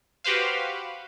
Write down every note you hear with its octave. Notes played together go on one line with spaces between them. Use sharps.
F#4 G4 B4 C5 F5